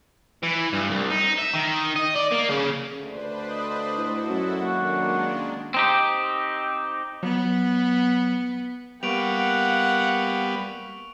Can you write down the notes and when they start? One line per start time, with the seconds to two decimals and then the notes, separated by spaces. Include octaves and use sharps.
0.43 E3
0.73 G2
0.91 C2
1.11 D#4
1.38 E5
1.53 D#3
1.96 D#5
2.15 D5
2.31 A#3
2.49 C#3
2.99 D2 D4 B4 C5
3.50 D#5
3.97 A2 E4 F#4 A4
4.29 F#2
4.61 D#3 G#3 A#3 D4 F#4
5.74 C4 D#4 G4
7.23 F#3 B3
9.03 G3 A#3 B3 F#5 C#6 D7 F7